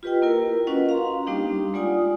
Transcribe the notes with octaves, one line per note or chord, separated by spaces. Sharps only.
F4 G4 B4 D#5 G5
A#3 E4 A#4
C#4 F4 F#4 B4 D#5 F#5
F5 A#5 C6
G3 A#3 D4 D#4 G4
G#3 F4 D5 F#5 G#5 D#6